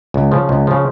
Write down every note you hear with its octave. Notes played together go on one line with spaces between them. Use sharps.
C#2
C#3 F3
C#2
C#3 F3